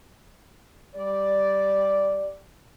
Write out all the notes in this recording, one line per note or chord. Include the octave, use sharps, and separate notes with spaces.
G3 D5